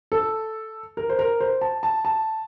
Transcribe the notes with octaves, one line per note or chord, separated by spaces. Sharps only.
A4
A#4
C5
A#4
C5
A5
A5
A5